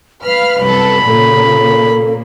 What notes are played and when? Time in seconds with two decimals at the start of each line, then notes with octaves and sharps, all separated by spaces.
0.24 B4 F5 B5 F6
0.62 C2 F#2 A4 B5
1.07 A#2 C#3 A#3 A4